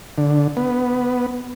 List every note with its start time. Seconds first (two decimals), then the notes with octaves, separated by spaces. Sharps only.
0.18 D3
0.57 B3